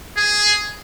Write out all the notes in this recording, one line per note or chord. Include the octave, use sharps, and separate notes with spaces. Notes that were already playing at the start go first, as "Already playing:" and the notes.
G#4